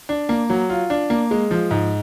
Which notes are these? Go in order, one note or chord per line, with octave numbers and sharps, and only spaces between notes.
D4
A#3
F#3
F4
D4
A#3
G#3
F3
G#2